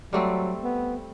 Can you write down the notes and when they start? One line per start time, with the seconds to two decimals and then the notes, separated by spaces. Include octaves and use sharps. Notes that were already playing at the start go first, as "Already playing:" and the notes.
0.13 F#3 G3 A3 C4
0.63 B3